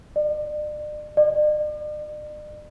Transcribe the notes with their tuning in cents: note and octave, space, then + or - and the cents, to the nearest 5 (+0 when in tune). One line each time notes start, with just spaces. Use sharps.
D5 +40
D5 +45